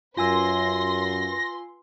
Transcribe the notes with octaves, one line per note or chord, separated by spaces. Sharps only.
F#2 F4 B4 G#5 C6 E6 A#6